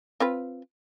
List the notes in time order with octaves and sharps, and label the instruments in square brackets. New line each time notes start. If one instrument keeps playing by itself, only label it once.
[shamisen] C4 F4 B4